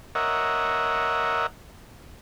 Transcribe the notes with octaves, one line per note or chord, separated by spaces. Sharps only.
A#4 C#5 D#5 E5 F#5